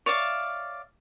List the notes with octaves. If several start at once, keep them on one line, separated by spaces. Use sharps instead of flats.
C#5 D5 E5 F5